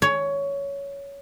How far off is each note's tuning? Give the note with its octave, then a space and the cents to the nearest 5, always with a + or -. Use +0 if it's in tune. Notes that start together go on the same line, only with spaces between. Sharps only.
C#5 +15